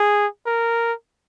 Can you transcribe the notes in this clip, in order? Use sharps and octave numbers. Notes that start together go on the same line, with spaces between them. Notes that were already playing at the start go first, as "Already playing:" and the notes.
Already playing: G#4
A#4